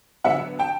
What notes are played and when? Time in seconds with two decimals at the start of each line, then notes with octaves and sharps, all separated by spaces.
0.24 D3 F#3 B3 E5 F#5
0.59 G5 A5